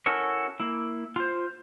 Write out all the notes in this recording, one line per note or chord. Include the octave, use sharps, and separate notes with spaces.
C#4 E4 F#4 A4 A#4 C#5
A#3 E4
F4 C5